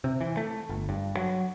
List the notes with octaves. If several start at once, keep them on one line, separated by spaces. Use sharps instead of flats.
C3
E3
A3
G1
G2
F#3